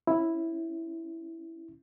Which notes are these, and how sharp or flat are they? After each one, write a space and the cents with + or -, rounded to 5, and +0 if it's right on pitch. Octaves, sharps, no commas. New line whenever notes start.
C#4 -15 E4 +0